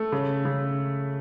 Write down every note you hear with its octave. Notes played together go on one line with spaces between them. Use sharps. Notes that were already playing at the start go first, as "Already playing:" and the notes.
Already playing: A3
C#3
C#3